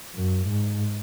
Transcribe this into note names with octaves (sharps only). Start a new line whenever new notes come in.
F#2
G#2